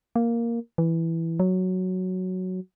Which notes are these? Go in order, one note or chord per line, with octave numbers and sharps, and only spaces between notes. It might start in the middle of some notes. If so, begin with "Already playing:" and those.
A#3
E3
F#3